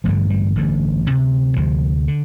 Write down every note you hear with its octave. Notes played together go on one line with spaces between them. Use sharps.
A1 G2 D3 F3
G3
A1 G2 D3
D2 C3
D2 C3 F3
D3